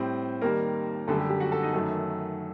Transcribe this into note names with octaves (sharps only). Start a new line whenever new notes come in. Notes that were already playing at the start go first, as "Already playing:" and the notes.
Already playing: A2 G3 C4 C5
D#2 D#3 G3 A#3 A#4
F#2 D3 G3 A3 A4
G4
G4
F#4 F#5
A4 A5
D#4 D#5
F#2 D#3 F#3 A3 A4